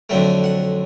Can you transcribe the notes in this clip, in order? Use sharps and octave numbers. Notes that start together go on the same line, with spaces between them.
F2 D3 F#3 A3 G5
F#5